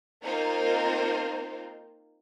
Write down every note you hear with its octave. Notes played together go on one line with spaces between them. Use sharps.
A#3 C4 D#4 F4 A#4 C5